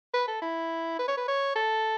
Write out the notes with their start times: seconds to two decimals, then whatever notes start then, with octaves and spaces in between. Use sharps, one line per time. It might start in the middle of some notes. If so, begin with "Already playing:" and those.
0.14 B4
0.28 A4
0.42 E4
0.99 B4
1.08 C#5
1.17 B4
1.28 C#5
1.56 A4